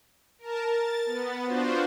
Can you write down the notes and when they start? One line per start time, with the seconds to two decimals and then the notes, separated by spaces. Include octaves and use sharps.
0.39 A#4 A5
0.70 A6
1.06 B3
1.45 D4 F4 F#4 C5